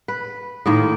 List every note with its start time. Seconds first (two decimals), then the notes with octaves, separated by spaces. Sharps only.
0.08 B4
0.66 A2 D#3 A#3